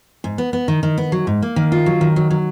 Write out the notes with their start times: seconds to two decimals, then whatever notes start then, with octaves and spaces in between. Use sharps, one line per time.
0.24 G#2
0.38 B3
0.53 B3
0.68 D#3
0.83 D#3
0.97 B3
1.12 F#3
1.27 G#2
1.42 A#3
1.56 D#3
1.72 F4
1.86 F#3
2.01 D#3
2.16 F#3
2.30 F#3